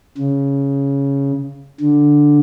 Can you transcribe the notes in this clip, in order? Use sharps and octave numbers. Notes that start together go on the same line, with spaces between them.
C#3
D3